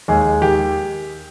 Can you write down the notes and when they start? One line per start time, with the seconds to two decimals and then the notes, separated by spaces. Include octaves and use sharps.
0.08 D#2 G#3 G#4
0.41 D#3 G4